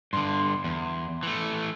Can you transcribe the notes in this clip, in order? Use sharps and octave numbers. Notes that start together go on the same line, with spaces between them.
G2 D3 C6
E2
E3 A3